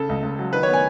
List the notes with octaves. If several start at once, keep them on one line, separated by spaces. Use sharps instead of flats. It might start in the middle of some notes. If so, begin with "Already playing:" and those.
Already playing: C#3 A4
C#2
C#2
F#3
D#3 B4
C#5
B3
G#5